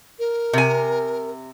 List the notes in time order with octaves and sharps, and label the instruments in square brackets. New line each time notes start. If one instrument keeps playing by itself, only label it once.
[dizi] A#4
[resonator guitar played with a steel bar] C3 G#5